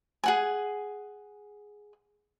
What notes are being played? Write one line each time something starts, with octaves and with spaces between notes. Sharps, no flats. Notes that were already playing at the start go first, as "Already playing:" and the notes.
G#4 F#5 G#5